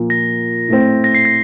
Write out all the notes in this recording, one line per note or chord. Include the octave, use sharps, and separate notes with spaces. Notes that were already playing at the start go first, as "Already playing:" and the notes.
Already playing: A#2 F3 A#3
A#6
A2 A3 C4
A#6
C7
A#6